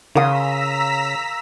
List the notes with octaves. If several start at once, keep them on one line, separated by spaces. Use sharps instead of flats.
C#3 F5 A#5 C6 D#6 E6 B6